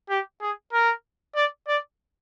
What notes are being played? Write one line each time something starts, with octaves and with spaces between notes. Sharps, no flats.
G4
G#4
A#4
D5
D5